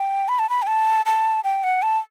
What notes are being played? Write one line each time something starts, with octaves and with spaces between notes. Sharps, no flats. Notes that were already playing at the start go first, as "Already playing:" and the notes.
Already playing: G5
B5
A5
B5
G5
A5
A5
G5
F#5
A5